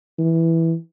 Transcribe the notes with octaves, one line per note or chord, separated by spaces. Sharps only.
E3